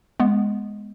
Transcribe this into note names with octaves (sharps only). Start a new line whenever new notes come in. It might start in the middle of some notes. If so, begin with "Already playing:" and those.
G#3 B3